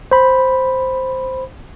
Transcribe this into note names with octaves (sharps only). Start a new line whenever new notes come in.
C5 B5